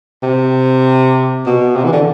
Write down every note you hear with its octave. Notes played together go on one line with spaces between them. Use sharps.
C3
B2
C3
E3
D3